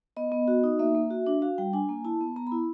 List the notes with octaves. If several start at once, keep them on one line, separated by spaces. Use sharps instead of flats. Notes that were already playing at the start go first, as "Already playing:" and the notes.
B3 D#5
B3
F#4
D#4
A#3 E5
A#3
F#4
D4
F#4 F5
G3 G5
D4 G#5
A#3
E4 A5
B3
B3 A#5
B5
E4